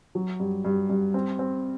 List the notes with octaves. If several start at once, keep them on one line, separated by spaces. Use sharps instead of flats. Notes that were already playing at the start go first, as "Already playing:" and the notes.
F#3
G2
G2
G2
C4
C4